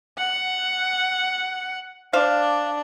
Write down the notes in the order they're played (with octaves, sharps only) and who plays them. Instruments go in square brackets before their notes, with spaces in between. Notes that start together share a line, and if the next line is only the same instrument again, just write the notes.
[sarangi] F#5
[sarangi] D4 [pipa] C5 F5